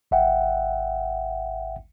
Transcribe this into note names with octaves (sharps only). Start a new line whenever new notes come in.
G#1 E5 F#5 G5